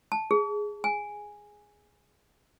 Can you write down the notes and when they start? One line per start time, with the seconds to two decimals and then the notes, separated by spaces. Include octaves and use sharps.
0.12 A5
0.31 G#4
0.84 G#5